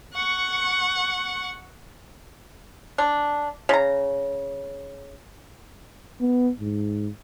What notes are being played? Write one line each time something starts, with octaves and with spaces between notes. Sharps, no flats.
F#5 C#6
D4
C#3 A#5
B3
G#2